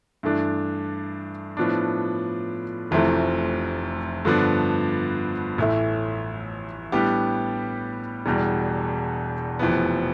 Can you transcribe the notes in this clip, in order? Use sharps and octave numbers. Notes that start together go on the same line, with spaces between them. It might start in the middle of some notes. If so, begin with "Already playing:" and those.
G2 E3 A3 D4
A2 F3 B3 D4
F1 F2 C3 E3 A3
G2 D3 F3 B3 D4
A1 A2 E3 A3 E4
A2 G3 B3 D4 G4
E1 E2 B2 G3
F1 F2 E3 B3